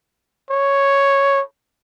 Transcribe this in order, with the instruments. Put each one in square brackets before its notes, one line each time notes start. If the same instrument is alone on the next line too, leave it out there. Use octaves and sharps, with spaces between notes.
[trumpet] C#5